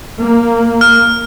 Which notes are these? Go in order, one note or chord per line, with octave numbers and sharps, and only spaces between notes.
A#3
F6